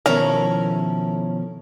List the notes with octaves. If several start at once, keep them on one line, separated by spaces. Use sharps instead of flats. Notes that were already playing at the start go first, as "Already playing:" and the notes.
B2 D#3 F3 C#4 E4 A4 A#4